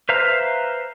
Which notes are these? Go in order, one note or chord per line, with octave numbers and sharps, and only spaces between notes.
B4 C5 E5 F5 A#5